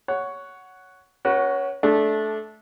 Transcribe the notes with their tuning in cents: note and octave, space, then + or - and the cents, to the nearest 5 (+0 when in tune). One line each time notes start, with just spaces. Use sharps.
C#5 +10 F#5 +0
C#4 +0 F#4 +10 B4 -40
A3 -20 D4 -5